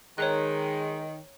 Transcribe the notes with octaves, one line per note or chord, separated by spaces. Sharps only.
D#3 G#3 C#5 A#5 F#6